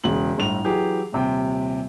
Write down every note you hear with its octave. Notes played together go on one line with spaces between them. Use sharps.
E1 C#3 F#7
G1 A2 F7
E3 F#3 G4 G#4
D#1 C3 G5